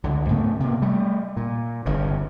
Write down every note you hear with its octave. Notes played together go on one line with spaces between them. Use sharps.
C#2 D3
G#2 C#3 A3 B3
C3 A#3
G3 A3
A#2
G1 G2 C#3